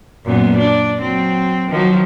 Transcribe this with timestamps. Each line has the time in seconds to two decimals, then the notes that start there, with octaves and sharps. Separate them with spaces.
0.25 F#2 A#2 B3
0.58 D4
0.99 F#3 C4
1.70 D#3 F3 F#3